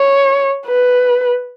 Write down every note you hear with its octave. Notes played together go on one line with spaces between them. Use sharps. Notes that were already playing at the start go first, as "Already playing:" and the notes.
Already playing: C#5
B4